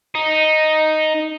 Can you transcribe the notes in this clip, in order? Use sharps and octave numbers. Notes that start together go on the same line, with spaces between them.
D#4